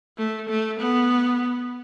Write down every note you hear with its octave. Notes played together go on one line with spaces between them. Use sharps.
A3
A3
B3